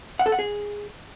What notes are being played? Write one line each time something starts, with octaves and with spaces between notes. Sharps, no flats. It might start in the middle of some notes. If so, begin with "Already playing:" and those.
F#5
A4
F#5
G#4